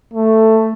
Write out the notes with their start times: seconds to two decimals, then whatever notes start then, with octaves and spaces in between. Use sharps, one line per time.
0.13 A3